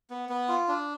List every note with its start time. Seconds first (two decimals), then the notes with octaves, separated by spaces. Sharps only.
0.10 B3
0.29 B3
0.49 F4
0.68 D4